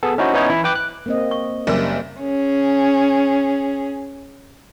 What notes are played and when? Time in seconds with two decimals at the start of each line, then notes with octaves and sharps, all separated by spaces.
0.03 B3 G#4 A4
0.18 C#4 D#4 E4 F#4 C5
0.34 B3 C#4 D#4 E4 C#5
0.50 E3 E4 B5
0.64 B4 G5 D6 F#6
0.75 F#6
1.06 A#3 C4 D#5
1.31 C#6
1.67 F#1 G3 A#3 A#4 D5 E5
2.20 C#4 G#4